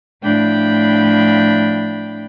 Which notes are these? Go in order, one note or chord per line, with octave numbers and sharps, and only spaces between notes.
A2 F3 D4 G5 B5